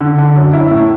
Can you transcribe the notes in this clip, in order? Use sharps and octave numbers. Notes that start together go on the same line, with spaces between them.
D3
D3
F#2
E4
A2